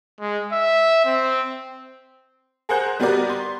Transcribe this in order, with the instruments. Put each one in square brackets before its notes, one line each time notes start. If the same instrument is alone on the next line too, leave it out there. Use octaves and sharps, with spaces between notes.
[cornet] G#3
E5
C4
[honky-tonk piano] G#4 A#4 C5 F#5 F#6 G6
G3 B3 F#4 G4 A#4 D5
C6